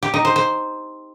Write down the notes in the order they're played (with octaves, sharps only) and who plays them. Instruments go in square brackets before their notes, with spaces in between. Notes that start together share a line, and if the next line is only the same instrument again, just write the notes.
[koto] G4
D#4
C5
C5